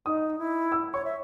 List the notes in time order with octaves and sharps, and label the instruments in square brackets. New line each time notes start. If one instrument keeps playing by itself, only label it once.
[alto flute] D#4 [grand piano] D#6
[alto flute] E4
[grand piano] E6
[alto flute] C#5 [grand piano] C#6
[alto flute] E5